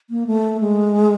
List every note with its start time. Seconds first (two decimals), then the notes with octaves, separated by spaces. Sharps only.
0.10 A#3
0.27 A3
0.60 G#3